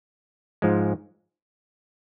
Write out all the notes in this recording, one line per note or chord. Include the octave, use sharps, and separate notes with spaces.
G#2 F3 G#3